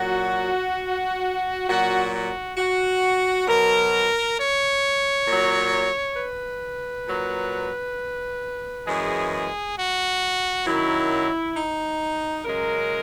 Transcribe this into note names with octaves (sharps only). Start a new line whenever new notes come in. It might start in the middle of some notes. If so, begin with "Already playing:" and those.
Already playing: A#2 F#3 F#4
A#2 F#3 F#4
F#4
F#4
B2 F#3 A#4
C#5
A#2 F#3
B4
A#2 F#3
F#2 E3 G#3 G#4
G#4
F#4
F#2 D#3 F#3 E4
D#4
F#2 C#3 G#3 A#4